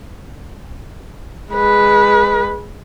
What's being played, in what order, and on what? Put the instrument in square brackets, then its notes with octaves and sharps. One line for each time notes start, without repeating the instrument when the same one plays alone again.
[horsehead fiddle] G#3 B4